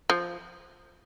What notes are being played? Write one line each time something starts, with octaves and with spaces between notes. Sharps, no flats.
F3